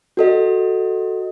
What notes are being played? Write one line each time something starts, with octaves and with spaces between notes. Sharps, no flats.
F#4 A4 D#5